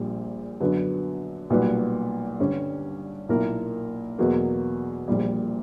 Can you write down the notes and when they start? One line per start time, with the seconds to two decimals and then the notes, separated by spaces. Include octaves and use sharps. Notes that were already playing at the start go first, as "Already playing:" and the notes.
Already playing: A#1 A#2 G3
0.61 F#2 D3 F#3 B3
1.50 B1 A#2 G3 B3 F#4
2.39 G2 D3 G3 C#4
3.29 B1 A#2 A#3 E4 A#4
4.18 E2 B2 F#3 A#3
5.08 A#1 A#2 G3